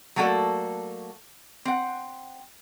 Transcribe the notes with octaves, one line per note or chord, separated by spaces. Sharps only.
F#3 A3 A#3 F#4 A4 D5
C4 F#5